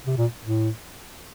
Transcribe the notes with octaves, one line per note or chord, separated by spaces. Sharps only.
C3
A#2
A2